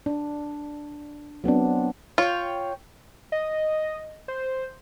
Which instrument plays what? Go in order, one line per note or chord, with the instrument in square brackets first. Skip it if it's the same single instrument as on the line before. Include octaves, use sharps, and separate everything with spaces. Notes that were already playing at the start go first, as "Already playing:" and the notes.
[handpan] D4
F#3 B3 C4 D4
[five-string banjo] F4 [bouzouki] C#5 G5
[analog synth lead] D#5
C5